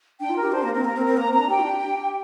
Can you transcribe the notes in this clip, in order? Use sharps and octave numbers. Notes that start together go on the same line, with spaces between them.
D4 G5
F4
A#4
G4
D4 C5
A#3 A#4
C4 A#4
A#3 A#4
C4
A#4
C4
A#3 A#5
C4
D4 A#5
G4 G5
D4
G4